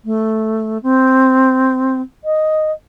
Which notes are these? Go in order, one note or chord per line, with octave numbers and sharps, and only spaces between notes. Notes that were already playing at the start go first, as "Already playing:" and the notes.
A3
C4
D#5